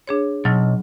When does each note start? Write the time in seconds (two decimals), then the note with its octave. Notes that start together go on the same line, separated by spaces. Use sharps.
0.07 D4 G#4 C#5
0.45 B1 F#3